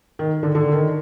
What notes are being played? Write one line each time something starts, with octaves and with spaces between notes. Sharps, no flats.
D#3
D3
D3
D#3